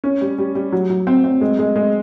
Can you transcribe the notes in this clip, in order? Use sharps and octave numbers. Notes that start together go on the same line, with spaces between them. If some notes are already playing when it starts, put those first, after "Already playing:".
C#4
G3
G3
G3
F#3
F#3
C4
C4
G#3
G#3
G#3